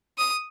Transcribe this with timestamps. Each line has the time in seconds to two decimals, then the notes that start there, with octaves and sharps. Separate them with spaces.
0.18 D#6